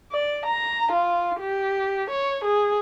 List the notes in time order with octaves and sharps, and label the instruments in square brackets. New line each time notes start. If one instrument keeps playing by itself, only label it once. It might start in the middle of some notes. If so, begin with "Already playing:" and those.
[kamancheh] D5
A#5
F4
G4
C#5
G#4